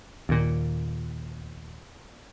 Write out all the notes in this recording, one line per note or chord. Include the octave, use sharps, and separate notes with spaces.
D#2 A#2